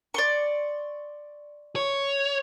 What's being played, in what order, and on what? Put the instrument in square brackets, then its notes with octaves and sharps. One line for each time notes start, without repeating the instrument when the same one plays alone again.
[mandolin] D5 C6 C#6
[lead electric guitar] C#5